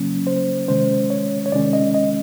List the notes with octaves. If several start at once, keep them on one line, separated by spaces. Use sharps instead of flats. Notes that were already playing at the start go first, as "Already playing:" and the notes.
Already playing: C#3 F#3 A#3 C#4
C5
C3 D#3 G#3 C#4 C5
C#5
C#5
C3 D#3 G#3 C#4 D5
D#5
D#5